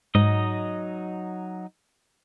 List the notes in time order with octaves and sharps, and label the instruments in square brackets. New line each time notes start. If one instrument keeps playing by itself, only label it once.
[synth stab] G#2 [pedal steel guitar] F#3 D#4 D#5